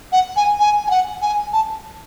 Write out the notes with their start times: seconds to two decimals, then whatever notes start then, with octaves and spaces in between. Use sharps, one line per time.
0.13 F#5
0.36 G#5
0.60 G#5
0.87 G#5
0.90 F#5
1.22 G#5
1.53 A5